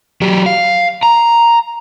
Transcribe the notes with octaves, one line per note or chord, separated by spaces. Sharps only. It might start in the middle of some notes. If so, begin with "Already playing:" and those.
F#3 G4
F5
A#5